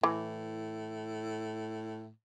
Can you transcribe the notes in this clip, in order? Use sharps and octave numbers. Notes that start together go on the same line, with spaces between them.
A2 E3